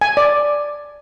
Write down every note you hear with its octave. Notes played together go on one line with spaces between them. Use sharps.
G#5
D5